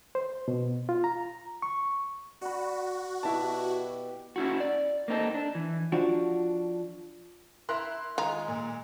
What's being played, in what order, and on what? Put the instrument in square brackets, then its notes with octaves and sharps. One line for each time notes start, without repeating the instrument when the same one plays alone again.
[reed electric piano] C5
B2
F4
A#5
C#6
[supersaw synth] F#4 [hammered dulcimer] D5 B5
[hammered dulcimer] B2 G4 [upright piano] E4 A5
[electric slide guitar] C#4 E4 F#4
D5
A#3 C4 D#4 F#4 A4
D4
E3
[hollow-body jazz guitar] F3 D4 F#4
[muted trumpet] E4 [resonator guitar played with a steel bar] A#4 E5 [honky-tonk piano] C6 F#6
[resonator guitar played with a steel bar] D#3 A#5 [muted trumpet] G#3 [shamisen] F4
[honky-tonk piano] A#2